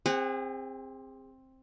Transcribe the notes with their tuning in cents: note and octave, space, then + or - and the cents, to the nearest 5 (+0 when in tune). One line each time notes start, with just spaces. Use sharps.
C4 +10 G#4 -35 F#5 +0